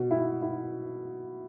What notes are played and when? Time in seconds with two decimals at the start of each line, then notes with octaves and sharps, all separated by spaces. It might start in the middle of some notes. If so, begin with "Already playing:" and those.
Already playing: B2
0.11 E4
0.42 E4